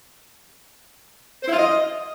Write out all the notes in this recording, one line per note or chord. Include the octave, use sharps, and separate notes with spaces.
C5
E4
F4
D#5